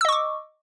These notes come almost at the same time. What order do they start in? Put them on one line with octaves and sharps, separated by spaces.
E6 D#5 C#6 D6